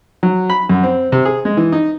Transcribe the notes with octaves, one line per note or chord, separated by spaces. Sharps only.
F#3
B5
F#2
C4
C3
G#4
G#3
E3
D#4